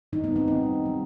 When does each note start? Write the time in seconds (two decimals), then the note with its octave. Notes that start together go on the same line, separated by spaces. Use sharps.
0.13 D#3 G3 D#4
0.24 B3
0.36 C4
0.48 D#3 G3 D#4
0.83 D#3 G3